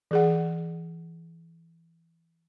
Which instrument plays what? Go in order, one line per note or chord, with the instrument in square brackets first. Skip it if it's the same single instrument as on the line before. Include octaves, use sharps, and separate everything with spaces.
[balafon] E3 G#4 F#5